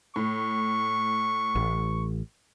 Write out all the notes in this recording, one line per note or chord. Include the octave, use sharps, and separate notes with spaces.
A2 C#6
A1